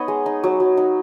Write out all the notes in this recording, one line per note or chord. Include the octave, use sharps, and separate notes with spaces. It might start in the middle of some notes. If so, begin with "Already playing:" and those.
Already playing: B3 D#4 C#5 D#5
G#3
D#4
F#3
F#3
D#4